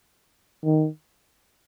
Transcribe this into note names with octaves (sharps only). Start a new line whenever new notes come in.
D#3